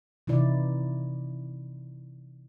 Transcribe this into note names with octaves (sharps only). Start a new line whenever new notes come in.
C3 E3 D#4 E4 D5